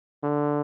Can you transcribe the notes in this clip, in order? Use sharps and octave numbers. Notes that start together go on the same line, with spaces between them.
D3